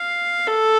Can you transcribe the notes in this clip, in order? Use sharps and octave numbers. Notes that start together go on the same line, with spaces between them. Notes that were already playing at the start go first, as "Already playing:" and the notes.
Already playing: F5
A4